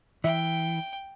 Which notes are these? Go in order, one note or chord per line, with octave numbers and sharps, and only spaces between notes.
E3 E5 G5